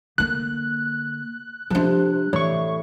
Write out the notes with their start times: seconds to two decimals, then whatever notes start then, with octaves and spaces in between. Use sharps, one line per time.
0.18 D3 A#3 F#6
1.70 C3 F3 D4 A4
2.33 A2 C3 E3 C#5 D5 C#6